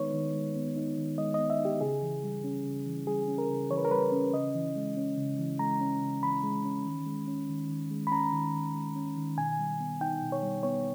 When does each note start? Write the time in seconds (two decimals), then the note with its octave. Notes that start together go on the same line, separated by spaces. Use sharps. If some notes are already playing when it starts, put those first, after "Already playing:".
Already playing: D#3 G#3 B3 D#4 B4 C#5
0.13 D#3
0.34 G#3
0.56 B3
0.76 D#4
0.98 D#3
1.18 G#3 D#5
1.34 B3 D#5
1.50 E5
1.60 D#4
1.65 G4
1.81 C#3 G#4
2.02 E3
2.23 G3
2.44 C#4
2.65 C#3
2.87 E3
3.07 G3 G#4
3.28 C#4
3.38 A#4
3.50 C#3
3.71 E3 C#5
3.77 B4
3.85 A#4
3.91 G3 B4
4.12 C#4
4.33 C#3 D#5
4.55 E3
4.76 G#3
4.97 C#4
5.17 C#3
5.39 E3
5.59 G#3 A#5
5.81 C#4
6.01 C#3
6.23 E3 B5
6.43 G#3
6.65 C#4
6.86 D#3
7.06 G#3
7.28 C#4
7.49 D#3
7.69 D#3
7.91 G#3
8.07 B5
8.11 C#4 A#5
8.33 D#3
8.54 D#3
8.74 G#3
8.96 C#4
9.17 D#3
9.37 B2 G#5
9.59 G3
9.80 B3
10.01 D#4 G5
10.22 B2
10.32 C#5
10.42 G3
10.63 B3 C#5